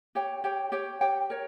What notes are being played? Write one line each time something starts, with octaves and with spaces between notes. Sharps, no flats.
G4 C#5 G5
G4 C#5 G5
G4 C#5 G5
G4 C#5 G5
A#4 C#5